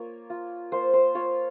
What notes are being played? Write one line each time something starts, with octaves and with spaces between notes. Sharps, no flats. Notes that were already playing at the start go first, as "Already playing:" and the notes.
Already playing: A#3 F4 C#5
F4
A#3 C5
C5
F4 C#5